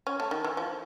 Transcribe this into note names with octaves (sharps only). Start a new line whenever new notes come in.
C#4
A3
D#3
E3
F3